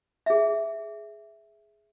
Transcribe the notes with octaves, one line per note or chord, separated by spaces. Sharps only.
G#4 E5